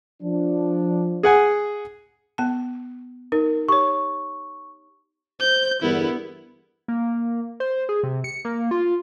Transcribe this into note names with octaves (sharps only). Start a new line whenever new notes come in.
F3 D4
G#4 F#5 G#5
B3 A5
D#4 A#4
G4 C#5 C#6
C5 G6
E2 G2 D3 B3 E4 A#4
A#3
C5
G#4
C3
C#7
A#3
F4